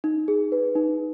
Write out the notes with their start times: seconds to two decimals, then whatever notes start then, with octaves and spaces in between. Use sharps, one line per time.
0.04 D#4
0.28 G#4
0.52 B4
0.76 D#4